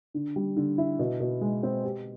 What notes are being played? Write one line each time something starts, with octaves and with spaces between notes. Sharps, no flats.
D3
G3
D3
E4
B2
B2
G#3
C4
G4